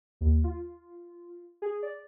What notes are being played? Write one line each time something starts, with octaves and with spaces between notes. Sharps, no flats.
D#2
F4
G#4
D5